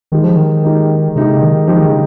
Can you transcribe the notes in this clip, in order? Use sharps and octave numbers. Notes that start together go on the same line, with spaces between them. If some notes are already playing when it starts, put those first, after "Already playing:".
D#3 G#3 D#4 G4
F3
D#3
G#3 D#4 G4
C3 G#3 D#4 G4
C#3
D#3
F3 G#3 D#4 G4
D#3
C#3